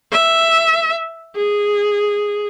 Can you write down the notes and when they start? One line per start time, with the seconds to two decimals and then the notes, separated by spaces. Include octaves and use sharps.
0.12 E5
1.36 G#4